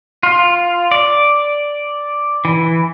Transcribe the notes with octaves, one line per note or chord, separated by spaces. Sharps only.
F4
D5
E3